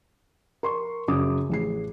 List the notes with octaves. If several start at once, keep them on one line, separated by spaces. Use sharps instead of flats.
A#4 C6 C#6
F#2 C#3 D6 D#6
A1 G#4 C7